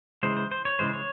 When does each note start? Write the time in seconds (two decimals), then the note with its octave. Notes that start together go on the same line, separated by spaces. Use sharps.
0.23 C#3 E3 G#3 C5
0.37 C5
0.51 C5
0.65 C#5
0.79 C#3 E3 G#3 C5
0.93 C#5